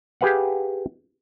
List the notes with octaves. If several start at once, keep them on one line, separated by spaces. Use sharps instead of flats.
G4 G#4 B4 F5 F#5